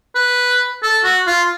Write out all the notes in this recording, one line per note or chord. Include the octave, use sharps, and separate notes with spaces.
B4
A4
F#4
F4